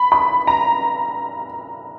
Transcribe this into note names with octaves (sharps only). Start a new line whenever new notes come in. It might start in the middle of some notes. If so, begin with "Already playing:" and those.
Already playing: B5
B5
A#5